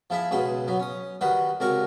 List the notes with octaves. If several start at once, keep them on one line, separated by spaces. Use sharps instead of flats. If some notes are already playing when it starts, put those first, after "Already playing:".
F3 E4 G#4 E5
C#2 B2 G#4 B4 C5
F#3 B3
C#4 D#6
D#3 G3 F#4 B4 D#6
C#2 C3 F#4 A#4 C#6